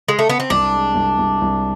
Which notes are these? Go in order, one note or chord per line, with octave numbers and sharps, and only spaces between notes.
G#3
A3
B3
C4
C2 D4
G#3
C2
C2
C2